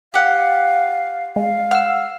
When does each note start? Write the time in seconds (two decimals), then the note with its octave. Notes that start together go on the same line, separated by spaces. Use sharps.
0.14 G4 F5 F#5
1.36 G#3 F5
1.71 F#5 E6 F6